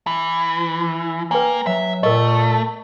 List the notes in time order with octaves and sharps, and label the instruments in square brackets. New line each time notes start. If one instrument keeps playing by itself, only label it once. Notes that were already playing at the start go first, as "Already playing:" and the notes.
[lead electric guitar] E3
[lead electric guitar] A#3 [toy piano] B4 G5 G#5
[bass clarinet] F#3 [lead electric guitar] E5
[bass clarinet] A#2 [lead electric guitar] A3 [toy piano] A#4 D#5